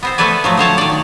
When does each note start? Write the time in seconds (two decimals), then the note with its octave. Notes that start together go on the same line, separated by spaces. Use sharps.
0.03 B3 C4 C5
0.18 A3 B3 A4 B4 D5 G#5
0.44 F3 F#3 A3
0.57 D3 C5 C#5 A5
0.78 D#3 D5